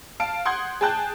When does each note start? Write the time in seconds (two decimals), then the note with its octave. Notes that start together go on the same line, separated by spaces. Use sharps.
0.20 F5 A5 D7
0.45 F#5 C6 D#6 G6 G#6
0.81 G#4 G5 A5 F#6 G6